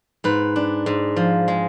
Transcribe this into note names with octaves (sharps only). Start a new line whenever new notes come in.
G#2 B4
D4
G#2
F3
G#3